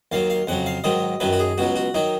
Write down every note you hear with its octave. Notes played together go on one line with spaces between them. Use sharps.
D#2 D#3 F#3 F5
F5
F2 C#3 F#3 F#5
F5
G#2 D#3 F#3 D#5
F#2 D#3 F#3 B4
F#4
G#4
C#2 B2 F#3 F#4
F#4
D#3 F#3 D#4